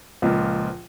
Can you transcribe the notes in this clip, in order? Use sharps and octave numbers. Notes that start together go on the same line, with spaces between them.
C#2 A#2 F3